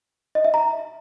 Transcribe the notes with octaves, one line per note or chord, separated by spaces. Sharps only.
D#5
E5
A#5